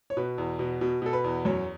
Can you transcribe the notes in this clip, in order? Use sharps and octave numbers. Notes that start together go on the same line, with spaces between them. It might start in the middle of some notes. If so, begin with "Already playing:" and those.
C#5
B2 B4
E2
B2
B2
B2 A4
B4
E2
F#2 C#5